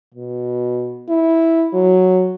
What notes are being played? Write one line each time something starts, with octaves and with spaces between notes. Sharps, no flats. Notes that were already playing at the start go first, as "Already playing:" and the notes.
B2
E4
F#3